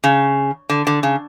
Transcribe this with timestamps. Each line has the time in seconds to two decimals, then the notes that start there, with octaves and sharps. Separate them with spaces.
0.04 C#3
0.69 D3
0.87 D3
1.03 C#3